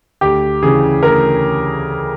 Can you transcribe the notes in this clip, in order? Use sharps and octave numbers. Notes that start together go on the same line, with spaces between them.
D2 G4
C#3 E3 G#4
D2 A#4